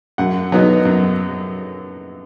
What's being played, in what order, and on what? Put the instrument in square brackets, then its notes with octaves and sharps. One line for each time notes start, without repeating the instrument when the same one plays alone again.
[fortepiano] F#2 F#5
F#3 B3 D#4
F#2